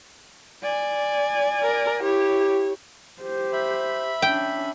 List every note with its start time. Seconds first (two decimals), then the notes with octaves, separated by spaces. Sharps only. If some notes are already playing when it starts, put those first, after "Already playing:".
0.62 D5 G#5
1.63 A#4
2.02 E4 G4 C#5
3.21 G4 C5
3.53 E5 B5
4.22 C#4 D4 G5